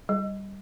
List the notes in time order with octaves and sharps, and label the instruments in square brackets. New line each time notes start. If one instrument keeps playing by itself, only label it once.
[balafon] G3